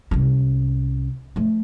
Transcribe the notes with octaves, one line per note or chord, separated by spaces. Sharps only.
C2 C#4
F3 A3